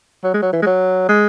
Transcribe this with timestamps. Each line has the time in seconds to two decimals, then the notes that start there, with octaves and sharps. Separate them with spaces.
0.24 F#3
0.34 G#3
0.42 F#3
0.53 E3
0.62 G#3
0.66 F#3
1.09 G#3